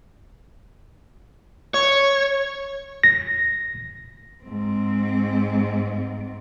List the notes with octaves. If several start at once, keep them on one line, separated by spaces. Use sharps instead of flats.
C#5
A#6
G#2 C4